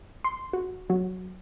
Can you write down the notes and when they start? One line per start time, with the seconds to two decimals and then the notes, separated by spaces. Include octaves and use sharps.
0.24 C6
0.53 F#4
0.90 F#3